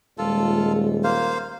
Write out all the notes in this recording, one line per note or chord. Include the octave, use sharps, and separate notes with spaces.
D#1 G#3 F4 A4
A#3 C5 F5